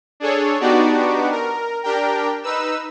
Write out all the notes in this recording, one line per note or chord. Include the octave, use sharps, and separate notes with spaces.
D4 G#4 A4 C#5
B3 D4 D#4 F#4 G4 D5
A#4
D4 G4 A#4 G5
D#4 B4 E6